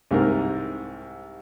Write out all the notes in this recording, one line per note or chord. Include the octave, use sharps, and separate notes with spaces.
C2 G#2 A#4